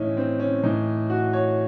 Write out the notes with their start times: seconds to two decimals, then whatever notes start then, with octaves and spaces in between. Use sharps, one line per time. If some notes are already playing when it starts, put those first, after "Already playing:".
Already playing: A2 E3 C#4 D#4 E4
0.17 C4
0.40 C#4
0.63 A2 E3 D#4
1.10 F#4
1.33 C#5